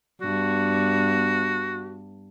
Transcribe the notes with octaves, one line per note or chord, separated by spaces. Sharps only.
G2 B3 F#4